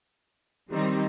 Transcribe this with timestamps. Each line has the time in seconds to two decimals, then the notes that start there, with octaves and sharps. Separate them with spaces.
0.71 D#3 G3 C4 D#4